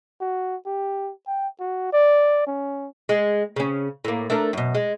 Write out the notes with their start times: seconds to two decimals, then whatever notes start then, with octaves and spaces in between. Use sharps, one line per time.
0.21 F#4
0.66 G4
1.27 G5
1.60 F#4
1.93 D5
2.47 C#4
3.09 G#3
3.56 C#3 C#4
4.05 A2 A#3
4.30 A3 D4 A#4
4.53 F#2 B2
4.75 G#3